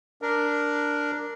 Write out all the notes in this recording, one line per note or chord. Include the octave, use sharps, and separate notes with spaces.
D4 A#4